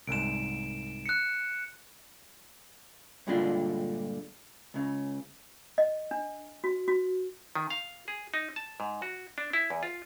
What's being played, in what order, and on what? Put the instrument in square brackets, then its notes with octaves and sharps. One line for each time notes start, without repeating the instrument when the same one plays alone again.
[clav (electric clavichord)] C2 G#2 [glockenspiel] D7 E7
[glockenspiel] F#6 C#7
[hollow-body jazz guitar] G2 A#2 D3 G#3 D4 F4
C#2 C#3
[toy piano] D#5
D4
F#4
F#4
[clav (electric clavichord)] D#3
F5
G#4
D#4
A5
G#2
F#4
D4
E4
E2
F4